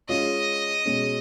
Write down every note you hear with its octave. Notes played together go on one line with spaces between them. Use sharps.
G#3 C#4 F4 D#5
B2 G#3 C#4